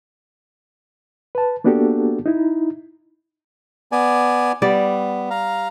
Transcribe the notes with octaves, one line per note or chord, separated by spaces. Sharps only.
B4 A5
A#3 B3 D4 F#4 G4 A4
D#4 E4
B3 D5 G#5
G3 B3 D5
F5 A#5